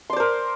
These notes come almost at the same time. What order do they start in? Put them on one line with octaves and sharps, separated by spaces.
C6 D5 C5 A#4